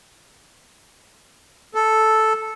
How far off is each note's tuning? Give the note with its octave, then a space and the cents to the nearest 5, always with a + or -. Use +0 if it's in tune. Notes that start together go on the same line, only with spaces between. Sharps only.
A4 -5